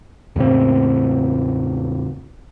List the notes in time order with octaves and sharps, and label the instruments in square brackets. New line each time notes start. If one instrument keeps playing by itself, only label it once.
[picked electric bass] E2 A2 C#3 C4